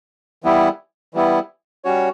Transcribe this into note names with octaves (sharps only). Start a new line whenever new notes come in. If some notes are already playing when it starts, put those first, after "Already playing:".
E3 G3 B3 E4
E3 G3 B3 E4
G3 C#4 F#4 C#5